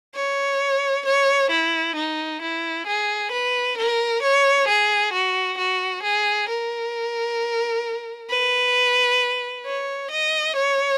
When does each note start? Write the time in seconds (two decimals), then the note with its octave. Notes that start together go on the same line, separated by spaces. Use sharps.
0.15 C#5
1.06 C#5
1.51 E4
1.96 D#4
2.42 E4
2.87 G#4
3.32 B4
3.77 A#4
4.23 C#5
4.68 G#4
5.13 F#4
5.58 F#4
6.03 G#4
6.49 A#4
8.30 B4
9.66 C#5
10.11 D#5
10.56 C#5